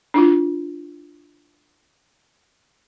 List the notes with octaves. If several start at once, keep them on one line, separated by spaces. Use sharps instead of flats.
D4 E4 F4